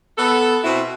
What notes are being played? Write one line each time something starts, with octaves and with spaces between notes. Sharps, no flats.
B3 A4
B2 C4 E4 F#4 E5